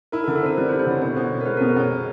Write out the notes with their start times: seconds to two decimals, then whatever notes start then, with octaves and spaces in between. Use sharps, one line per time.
0.12 E4 A#4
0.24 A4
0.28 D3
0.36 A4
0.43 C4 A#4
0.57 G3 B4
0.69 C5
0.72 E4
0.79 C5
0.87 D3 C#5
1.01 B2 C5
1.16 B2
1.31 C4
1.41 A#4
1.46 G#3 B4
1.57 B2 A#4
1.69 B4
1.76 B2 C#5